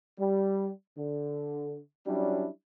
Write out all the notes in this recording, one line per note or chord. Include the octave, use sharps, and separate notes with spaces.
G3
D3
F#3 G3 C#4 D4 E4